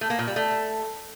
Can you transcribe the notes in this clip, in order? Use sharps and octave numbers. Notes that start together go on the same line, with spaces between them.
A3
A#3
A#2
G3
A3